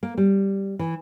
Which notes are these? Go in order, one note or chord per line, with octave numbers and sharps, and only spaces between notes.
A#3
G3
E3